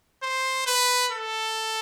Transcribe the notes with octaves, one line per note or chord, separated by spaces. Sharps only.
C5
B4
A4